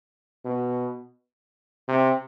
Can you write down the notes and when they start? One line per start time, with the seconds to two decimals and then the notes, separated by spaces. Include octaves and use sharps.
0.45 B2
1.88 C3